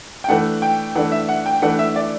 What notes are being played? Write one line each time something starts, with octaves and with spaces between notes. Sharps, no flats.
G5
E3 A3 D4 F#5
G5
E3 A3 D4 F#5
E5
F#5
G5
E3 A3 D4 F#5
E5
D5